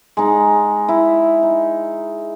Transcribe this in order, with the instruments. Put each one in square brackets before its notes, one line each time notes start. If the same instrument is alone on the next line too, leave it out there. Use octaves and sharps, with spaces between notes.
[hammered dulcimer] G#3 D#4
E4
D#4